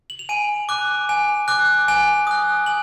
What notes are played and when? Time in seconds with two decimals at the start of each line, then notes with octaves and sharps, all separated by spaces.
0.10 F#7
0.19 F7
0.29 G#5 D#7
0.69 D6 F#6
1.09 G#5
1.48 D6 F#6
1.88 G#5
2.27 D#6 F#6
2.66 G#5 F#7